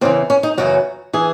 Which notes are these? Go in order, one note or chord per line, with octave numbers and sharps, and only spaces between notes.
E2 C#3 E3 C4
C#4
D#4
F#2 C#3 E3 F#4
E3 G#4